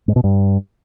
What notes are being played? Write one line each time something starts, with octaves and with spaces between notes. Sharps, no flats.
G#2
B2
G2